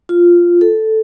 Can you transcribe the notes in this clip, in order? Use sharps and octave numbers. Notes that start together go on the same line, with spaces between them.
F4
A4